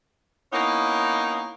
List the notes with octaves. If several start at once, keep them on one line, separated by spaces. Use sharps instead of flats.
A#3 B3 C#4 D#4 E4